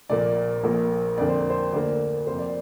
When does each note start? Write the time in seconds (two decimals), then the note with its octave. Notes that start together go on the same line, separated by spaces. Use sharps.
0.09 A#1 A#2 A#3 D5
0.64 A#1 A#2 A#3
1.17 F2 D3 A#3 D5
1.29 C5
1.40 A#4
1.50 C5
1.72 D2 D3 A#3 D5
2.27 F2 C3 A#3 C5
2.39 D5